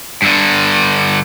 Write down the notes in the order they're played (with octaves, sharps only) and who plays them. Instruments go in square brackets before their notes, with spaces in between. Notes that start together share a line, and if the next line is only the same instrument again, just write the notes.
[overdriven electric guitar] G2 D3